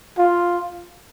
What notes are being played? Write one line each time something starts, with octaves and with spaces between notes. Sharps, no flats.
F4